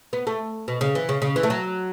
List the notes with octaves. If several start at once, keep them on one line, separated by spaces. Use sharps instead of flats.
B3
A3
B2
C#3
E3
C#3
C#3
E3
A3
F#3